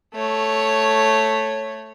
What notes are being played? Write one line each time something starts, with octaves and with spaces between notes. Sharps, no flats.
A3 C#5